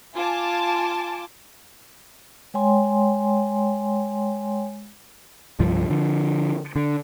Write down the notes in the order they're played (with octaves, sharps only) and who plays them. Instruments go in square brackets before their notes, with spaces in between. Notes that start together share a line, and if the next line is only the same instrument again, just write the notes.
[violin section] F4 G#5 A5 D6
[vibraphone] G#3 C#5 G5 G#5 C6
[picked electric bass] C2 G2 F3
D3 F3
D3